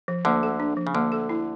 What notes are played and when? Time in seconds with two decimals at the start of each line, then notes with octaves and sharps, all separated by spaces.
0.08 F3
0.25 D2 D3 A#3
0.43 A4
0.60 D4
0.77 F3
0.87 C#3
0.94 D2 D3 A#3
1.12 A4
1.29 E4